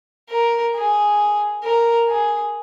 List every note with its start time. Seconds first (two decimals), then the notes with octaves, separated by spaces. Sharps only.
0.30 A#4
0.75 G#4
1.63 A#4
2.08 G#4